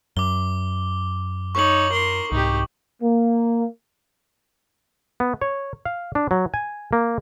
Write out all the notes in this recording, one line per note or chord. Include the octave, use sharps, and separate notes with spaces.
F#2 D6 G7
D#4 C#5 C#6 F#7
A#4 C6
C2 G#2 D#4 G4
A#3
B3
C#5
F5
D4
F#3
G#5
A#3